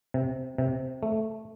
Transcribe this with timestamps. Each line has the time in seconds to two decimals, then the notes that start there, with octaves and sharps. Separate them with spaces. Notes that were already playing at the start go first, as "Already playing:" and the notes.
0.14 C3
0.58 C3
1.03 A3